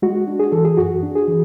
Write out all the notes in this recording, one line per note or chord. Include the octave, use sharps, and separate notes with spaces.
G#3 F#4
D4
G#4
E3 A4
G#4
F#2 F#4
D4
G#4
E3